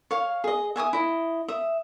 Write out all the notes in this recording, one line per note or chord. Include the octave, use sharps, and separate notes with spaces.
C#5 F5
G#4 D#5
E5 G#5 D6 D#6
E4 D#5
E5 D#6